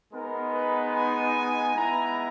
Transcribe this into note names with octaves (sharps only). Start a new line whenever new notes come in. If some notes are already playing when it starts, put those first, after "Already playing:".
G#3 B3 D#4 A#4
B4
G#5
G#3 B3 E4 A#5